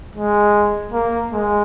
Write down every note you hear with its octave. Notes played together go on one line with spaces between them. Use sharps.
G#3
A#3
G#3